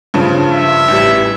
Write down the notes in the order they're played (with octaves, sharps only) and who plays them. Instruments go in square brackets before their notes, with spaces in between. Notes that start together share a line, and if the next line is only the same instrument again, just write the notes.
[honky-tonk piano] G2 C#3 F3
[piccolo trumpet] E5
[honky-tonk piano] A1 E3 G3